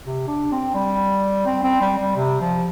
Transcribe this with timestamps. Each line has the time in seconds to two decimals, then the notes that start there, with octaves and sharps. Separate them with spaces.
0.05 C3
0.28 D4
0.52 C4
0.75 G3
1.46 C4
1.64 C4
1.81 G3
1.99 G3
2.16 C3
2.41 F3